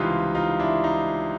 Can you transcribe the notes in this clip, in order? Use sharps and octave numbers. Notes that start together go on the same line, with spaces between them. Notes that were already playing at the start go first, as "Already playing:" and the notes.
Already playing: C#2 C3 E3 G3 D#4 F4
D#4 F4
D4 E4
D#4